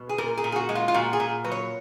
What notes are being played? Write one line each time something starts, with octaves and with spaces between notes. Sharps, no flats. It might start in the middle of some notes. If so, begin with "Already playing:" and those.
Already playing: B2
G#4
A#2 A#4
G#4
A#2
G#4
F#4
G#3
F4
F4
A#2 F#4
G#4
A#2
F#3 B4
C#5